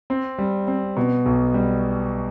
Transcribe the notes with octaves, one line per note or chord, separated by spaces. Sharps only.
C4
G3
C4
B2
B1
G3